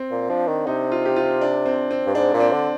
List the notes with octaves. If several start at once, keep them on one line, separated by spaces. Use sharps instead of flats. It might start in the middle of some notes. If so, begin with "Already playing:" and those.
Already playing: C4
A#2
F3 D4
D#3
C3 D#4
F4
G4
F4
D4
C4
C4
G2
G#2 D4
A#2
C4
D3